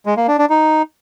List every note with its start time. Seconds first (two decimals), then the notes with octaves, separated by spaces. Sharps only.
0.06 G#3
0.17 A#3
0.28 D4
0.39 D4
0.50 D#4